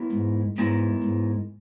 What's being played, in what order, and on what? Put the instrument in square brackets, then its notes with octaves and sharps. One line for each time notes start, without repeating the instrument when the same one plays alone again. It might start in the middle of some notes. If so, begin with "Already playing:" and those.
Already playing: [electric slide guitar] B3 E4 A#4
[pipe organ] G#2
[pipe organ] G#2 [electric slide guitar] B3 E4 A#4
[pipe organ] G#2